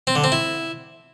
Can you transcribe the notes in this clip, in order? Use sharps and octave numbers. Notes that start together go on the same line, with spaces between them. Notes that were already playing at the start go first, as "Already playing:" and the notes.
C4
D3
C4
E4